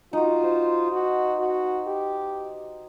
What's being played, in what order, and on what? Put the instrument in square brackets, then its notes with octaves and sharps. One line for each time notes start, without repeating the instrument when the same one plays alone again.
[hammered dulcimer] D#4 F#4 [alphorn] F4
[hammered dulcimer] C5
[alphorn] F#4
F#4
G4